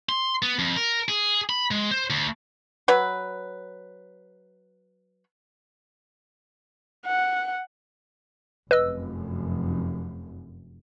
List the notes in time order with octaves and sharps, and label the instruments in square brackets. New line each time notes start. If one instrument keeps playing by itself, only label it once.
[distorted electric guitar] C6
B3
F2
A#4
G#4
B5
G#3
C5
D2
[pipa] F#3 B4
[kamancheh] F#5
[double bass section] F1 F#2 [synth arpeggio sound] B4 D#5 E6